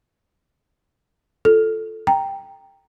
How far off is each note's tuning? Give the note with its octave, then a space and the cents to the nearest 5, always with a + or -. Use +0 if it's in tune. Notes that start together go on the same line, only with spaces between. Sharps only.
F4 +0 A4 +0
G5 +0 A#5 +0